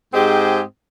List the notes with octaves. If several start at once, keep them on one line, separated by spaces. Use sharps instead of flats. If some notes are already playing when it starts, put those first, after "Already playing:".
G#2 C4 G4 G#4 D#5